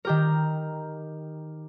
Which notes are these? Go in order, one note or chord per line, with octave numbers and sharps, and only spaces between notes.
D#3 G4 A#4